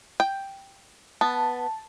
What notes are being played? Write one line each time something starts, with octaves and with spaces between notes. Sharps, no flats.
G5
B3 A5